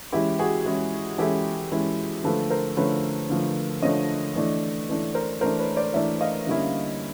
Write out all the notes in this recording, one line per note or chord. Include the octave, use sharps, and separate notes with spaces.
E3 G#3 C#4 E4 G4
F#4 G#4
E3 G#3 C#4 E4
E3 G#3 C#4 E4 G4 A4
E3 G#3 C#4 E4
D3 F3 A3 A4 B4
A#4 C5
D3 F3 A3 B4 C#5
D3 F3 A3
D3 F3 A3 C#5 D#5
E3 A3 D4
E3 A3 D4
A#4 C5
E3 A3 D4 A#4 C5
B4 C#5
C5 D5
E3 A3 D4 D5 E5
D#5 F5
D3 G3 A#3 C#4 E4